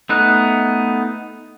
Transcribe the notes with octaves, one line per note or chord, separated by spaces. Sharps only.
A3 B3 D#4 F#6